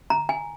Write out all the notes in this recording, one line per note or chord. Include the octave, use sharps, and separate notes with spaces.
A#5
G#5